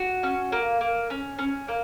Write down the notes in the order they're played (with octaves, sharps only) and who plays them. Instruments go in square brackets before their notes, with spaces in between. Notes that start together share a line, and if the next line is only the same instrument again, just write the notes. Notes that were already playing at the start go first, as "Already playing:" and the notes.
Already playing: [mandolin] F#4
C#4
A#3
A#3
C#4
C#4
A#3